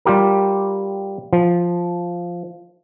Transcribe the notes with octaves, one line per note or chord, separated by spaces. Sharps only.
G3 F4 G4 A#4
F3